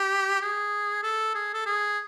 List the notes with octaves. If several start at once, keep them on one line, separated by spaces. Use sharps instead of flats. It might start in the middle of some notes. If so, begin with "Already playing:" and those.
Already playing: G4
G#4
A4
G#4
A4
G#4